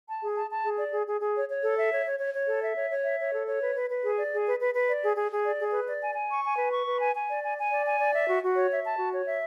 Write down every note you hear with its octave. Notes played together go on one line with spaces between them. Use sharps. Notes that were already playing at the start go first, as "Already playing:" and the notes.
A5
G#4
A5
A5
G#4
D5
G#4
G#4
G#4
C#5
C#5
A4
E5
C#5
C#5
C#5
C#5
A4
E5
C#5
C#5
E5
C#5
A4
C#5
B4
B4
B4
G#4
D5
G#4
B4
B4
B4
D5
G#4
G#4
G#4
D5
G#4
B4
D5
G#5
G#5
C#6
G#5
B4
C#6
B4
G#5
G#5
D5
G#5
G#5
D5
G#5
D5
E5
F#4
F#4
C#5
E5
A5
F#4
C#5
E5